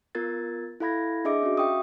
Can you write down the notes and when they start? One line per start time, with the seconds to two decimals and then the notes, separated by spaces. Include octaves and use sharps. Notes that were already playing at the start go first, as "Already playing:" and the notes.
0.15 B3 F4 A#4 G#6 A6
0.80 E4 A4 F5 B5 G#6 A#6
1.25 D4 G#4 D#5 E5 D6 D7
1.42 C#4 F#4
1.57 E5 F5 G5 C#6 D#6